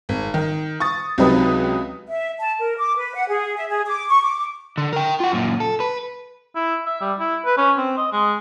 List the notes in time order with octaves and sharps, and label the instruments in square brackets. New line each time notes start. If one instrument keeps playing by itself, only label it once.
[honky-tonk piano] G#1
D#3
C#6 D#6 A6
C#2 C3 F#3 D#4 B4 D#6
[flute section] E5
A5
A#4
D6
B4
F#5
G#4
E5
G#4
D6
C#6
D6
[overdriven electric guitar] D3
A#4 G5
F4 F#5
F#2 A#2
A4
B4
[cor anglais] E4
E5
G3
E4
B4
C#4
C4
D#5
G#3